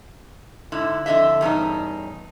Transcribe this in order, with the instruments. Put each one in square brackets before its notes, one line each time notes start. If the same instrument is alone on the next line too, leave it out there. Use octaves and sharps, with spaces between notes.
[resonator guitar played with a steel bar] G#2 D3 E4
F2 D3 G#4 D#5 E5
E2 G2 C#3 D#4